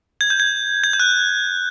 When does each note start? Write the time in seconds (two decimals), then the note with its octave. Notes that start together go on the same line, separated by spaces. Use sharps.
0.21 G#6
0.30 G6
0.40 G#6
0.84 G#6
0.93 G6
1.00 F#6